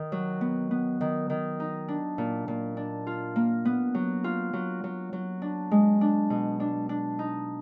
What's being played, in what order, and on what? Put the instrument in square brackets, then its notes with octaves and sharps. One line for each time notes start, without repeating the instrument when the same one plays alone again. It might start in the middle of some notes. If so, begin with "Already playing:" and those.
Already playing: [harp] D#3
F#3
B3
B3
D#3
D#3
D#4
D4
A#2
A#2
D4
F4
A#3
B3
F#3
F4
F#3
F#3
F#3
D4
G#3
D4
B2
D4
D4
D#4